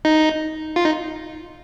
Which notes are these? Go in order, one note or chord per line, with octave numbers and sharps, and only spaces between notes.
D#4
F4
D#4